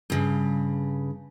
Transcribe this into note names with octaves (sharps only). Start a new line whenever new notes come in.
G2 C#3